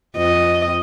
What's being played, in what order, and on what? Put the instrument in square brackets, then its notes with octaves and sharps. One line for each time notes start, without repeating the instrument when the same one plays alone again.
[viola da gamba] F2 D#5